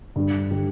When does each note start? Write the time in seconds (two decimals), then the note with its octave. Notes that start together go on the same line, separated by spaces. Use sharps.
0.16 G2 D3 G3
0.51 D3 G3